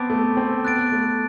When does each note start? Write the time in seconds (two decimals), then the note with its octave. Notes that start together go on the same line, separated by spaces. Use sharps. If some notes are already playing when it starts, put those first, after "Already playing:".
Already playing: B3 C4 A5 D6 A6 D7
0.10 A3
0.37 C4
0.64 B3 F#6 A6 D7
0.92 A3